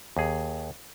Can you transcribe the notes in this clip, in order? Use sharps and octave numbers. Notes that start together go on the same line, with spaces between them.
D#2 G#4